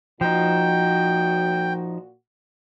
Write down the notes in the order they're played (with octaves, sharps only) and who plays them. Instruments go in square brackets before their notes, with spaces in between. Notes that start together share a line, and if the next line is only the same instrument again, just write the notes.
[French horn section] A#2 F#4 [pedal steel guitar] F3 D#4 [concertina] G5